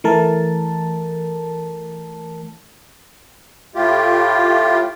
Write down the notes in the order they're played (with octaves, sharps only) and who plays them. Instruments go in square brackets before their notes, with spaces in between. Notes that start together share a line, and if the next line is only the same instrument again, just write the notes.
[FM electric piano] E3 A3 A#4 A5
[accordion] A2 A3 F4 G4